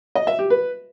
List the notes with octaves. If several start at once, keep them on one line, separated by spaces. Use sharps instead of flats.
D#5
E5
G4
B4